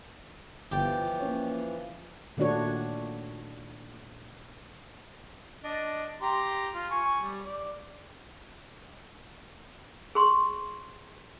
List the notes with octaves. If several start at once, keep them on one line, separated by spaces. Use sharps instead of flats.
G1 E3 F3 G4 D5 G5
A#3 C#4 C#5
A#2 D#3 A3 D4 F#4 C#5
D4 D#5
G4 A#5 C6
F4
G#5 C#6
G3
D5
G#4 C6 C#6